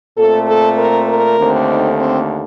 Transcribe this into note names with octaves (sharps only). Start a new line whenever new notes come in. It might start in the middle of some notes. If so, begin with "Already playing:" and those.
A#2 A3 C4 A4
A4
A#4
A#4
D#2 D3 A3 C4
D#4
C4